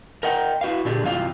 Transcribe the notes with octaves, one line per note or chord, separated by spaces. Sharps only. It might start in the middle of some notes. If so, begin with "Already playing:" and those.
A#4 D#5 F#5 G5
E4 F#4 B4 F5
A#2 D3 D4 G4 G#4
G2 C3 E3 F#3 F4 F5